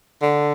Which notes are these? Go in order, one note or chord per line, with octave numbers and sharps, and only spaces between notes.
D3